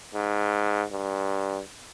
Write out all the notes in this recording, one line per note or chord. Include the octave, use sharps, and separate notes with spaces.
G#2
G2